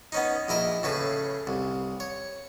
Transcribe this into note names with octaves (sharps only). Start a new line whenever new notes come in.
B3 C#4 D#4
A#1 E4 A#4 D#5
A2 C#3 B4
C2
C#5